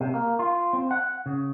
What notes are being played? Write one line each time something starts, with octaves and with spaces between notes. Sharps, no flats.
C3
A#3
F4
C4
F#5
C#3